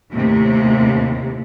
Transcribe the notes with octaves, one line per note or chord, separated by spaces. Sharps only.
D#2 A2 C3